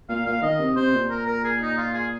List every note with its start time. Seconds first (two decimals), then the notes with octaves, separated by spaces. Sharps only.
0.09 A#2 F5
0.26 A#2 F5
0.42 D#3 D#5
0.59 C3
0.76 C3 C5
0.93 A#2
1.10 A#4
1.27 A#4
1.44 G#4
1.61 D#4
1.77 F4
1.94 G#4